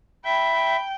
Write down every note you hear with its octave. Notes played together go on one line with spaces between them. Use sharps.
E5 G5 B5
G5